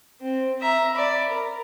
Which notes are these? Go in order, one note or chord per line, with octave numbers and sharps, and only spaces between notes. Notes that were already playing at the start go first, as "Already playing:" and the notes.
C4
E5 A#5
D5 B5
A#4